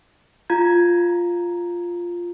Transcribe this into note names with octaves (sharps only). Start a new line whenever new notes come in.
F4 A#5 G#6